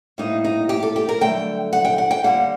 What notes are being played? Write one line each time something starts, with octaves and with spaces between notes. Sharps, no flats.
A2 G3 A#3 D#4
D#4
G4
A4
G4
A#4
G2 D3 F#3 A3 G5
F#5
G5
F#5
G5
D#2 D3 G3 A#3 F#5